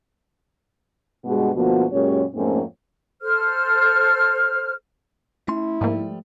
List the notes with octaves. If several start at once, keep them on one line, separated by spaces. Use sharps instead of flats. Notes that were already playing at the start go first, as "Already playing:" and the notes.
G2 B2 G#3 F#4
D2 B2 F3 A#3 B3 F#4
F#2 A#2 G#3 C#4 G4 C#5
F2 G#2 A3 A#3 C4 C#4
A4 C5 F6
A3 C#4 E4 C6
G#2 F3 G3 A3 A#3